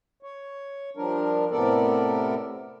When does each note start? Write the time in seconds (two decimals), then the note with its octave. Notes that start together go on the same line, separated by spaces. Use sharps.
0.23 C#5
0.97 F3 G3 D4 A#4
1.51 A2 C3 B3 A4 A#4 D5